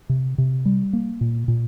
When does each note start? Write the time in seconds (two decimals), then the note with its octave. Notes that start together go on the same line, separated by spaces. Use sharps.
0.09 C3
0.38 C3
0.65 G3
0.93 A#3
1.21 A#2
1.48 A#2